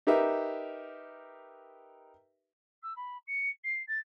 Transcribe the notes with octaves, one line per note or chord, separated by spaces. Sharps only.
D#4 G4 A#4 B4 E5
E6
B5
C#7
C7
A6